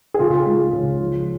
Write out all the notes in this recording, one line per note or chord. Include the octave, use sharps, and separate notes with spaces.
G#4
C#3 F4
G#3
C#3
F3